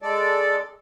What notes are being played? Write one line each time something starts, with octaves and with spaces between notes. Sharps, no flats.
G#3 A4 D5